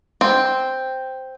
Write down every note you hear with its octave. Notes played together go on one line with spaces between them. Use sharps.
C4